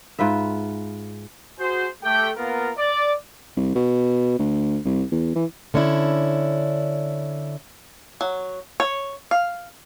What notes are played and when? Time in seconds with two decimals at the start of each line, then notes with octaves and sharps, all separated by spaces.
0.19 G#2 F4 B4 E5
1.58 F#4 G#4 C5
2.03 A3 G4 G5
2.36 A#3 B3 F4 A#4
2.77 D5
3.57 C2
3.75 B2
4.39 D2
4.85 C2
5.12 E2
5.36 E3
5.74 D3 C#4 D4 E4
8.21 F#3
8.80 C#5
9.31 F5